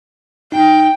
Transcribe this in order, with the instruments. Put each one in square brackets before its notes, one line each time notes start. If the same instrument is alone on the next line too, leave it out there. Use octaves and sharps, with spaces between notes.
[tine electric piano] D#4 [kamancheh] G5